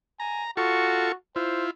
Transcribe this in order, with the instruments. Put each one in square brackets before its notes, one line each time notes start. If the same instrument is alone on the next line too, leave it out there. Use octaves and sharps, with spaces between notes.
[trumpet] G#5 [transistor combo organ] A#5
[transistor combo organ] F4 A4 C#6 [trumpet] F#4
[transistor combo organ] E4 F4 [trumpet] C5